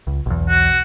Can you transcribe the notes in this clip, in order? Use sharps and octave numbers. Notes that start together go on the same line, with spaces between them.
C#2
B1 E2
F#4